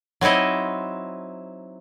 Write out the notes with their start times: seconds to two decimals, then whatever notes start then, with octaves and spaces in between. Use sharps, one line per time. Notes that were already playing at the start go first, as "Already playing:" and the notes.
0.21 F#3 C4 D#4 E4 D#5